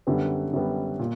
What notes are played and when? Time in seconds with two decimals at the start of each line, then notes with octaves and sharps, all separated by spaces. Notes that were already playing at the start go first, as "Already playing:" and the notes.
0.07 F#2 D3 G3 B3
0.53 F#2 D3 G3 B3
0.99 A#2